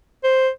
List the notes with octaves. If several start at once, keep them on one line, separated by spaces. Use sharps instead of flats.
C5